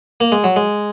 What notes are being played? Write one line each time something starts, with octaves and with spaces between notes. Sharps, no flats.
A#3
G#3
F#3
G#3